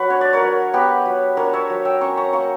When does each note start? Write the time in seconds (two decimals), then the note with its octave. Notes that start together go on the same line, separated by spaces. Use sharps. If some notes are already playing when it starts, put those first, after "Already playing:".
Already playing: F#3 F#4 B4
0.10 D4 C#5
0.21 D5
0.33 A#4 C#5
0.41 F#3
0.74 B3 G4 B4
1.05 F#3
1.37 D4 A#4 C#5
1.53 C#5 E5
1.70 F#3
1.85 E5 G5
2.01 C#4 A#5 C#6
2.17 A#5 C#6
2.33 A#3 A#5 C#6